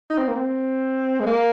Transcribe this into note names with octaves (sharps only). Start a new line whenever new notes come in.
D#4
C4
A#3
C4
G#3
A#3